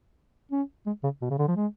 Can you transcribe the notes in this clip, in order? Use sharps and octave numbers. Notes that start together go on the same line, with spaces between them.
C#4
G#3
C#3
B2
C#3
D3
F3
G#3